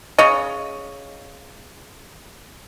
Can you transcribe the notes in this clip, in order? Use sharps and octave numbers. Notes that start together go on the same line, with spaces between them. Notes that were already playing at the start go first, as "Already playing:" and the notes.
C#3 C#5 D#5